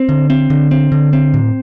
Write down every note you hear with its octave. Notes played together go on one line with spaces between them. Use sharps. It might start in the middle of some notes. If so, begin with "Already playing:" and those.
Already playing: C4
D3
C4
D3
C4
D3
C4
A2